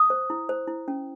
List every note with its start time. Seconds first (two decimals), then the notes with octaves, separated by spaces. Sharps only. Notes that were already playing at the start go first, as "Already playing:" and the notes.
Already playing: D#6
0.10 C5
0.30 E4
0.49 C5
0.68 E4
0.88 C#4